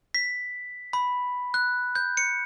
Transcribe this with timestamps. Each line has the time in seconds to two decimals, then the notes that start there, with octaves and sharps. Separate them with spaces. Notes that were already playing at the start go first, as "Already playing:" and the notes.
0.14 B6
0.93 B5
1.54 F#6
1.95 G6
2.17 C#7